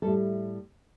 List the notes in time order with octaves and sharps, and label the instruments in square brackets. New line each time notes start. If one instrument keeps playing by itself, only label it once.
[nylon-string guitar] A2 G3 A4